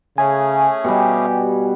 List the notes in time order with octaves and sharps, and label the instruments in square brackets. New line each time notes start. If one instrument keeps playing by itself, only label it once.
[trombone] C#3 [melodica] A3 C#4 G#4 [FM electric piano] G#5
[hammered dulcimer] B2 G3 [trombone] G4